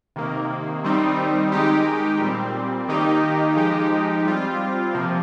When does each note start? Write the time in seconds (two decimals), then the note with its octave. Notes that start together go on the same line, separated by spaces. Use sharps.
0.16 C3 D#3 A#3
0.84 D#3 G3 C4 D#4
1.52 D#3 G#3 D#4 G4
2.21 A#2 G3 C4
2.88 D#3 A#3 D#4 G4
3.56 F3 G#3 D#4 G4
4.25 G3 C4 F4
4.93 C3 F3 A#3